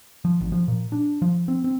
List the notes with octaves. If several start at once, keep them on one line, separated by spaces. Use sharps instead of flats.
F3
G#1
F3
A#2
D4
F3
C4
C4